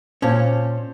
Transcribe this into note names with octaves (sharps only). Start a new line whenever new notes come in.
A#2 C#4 C5 A5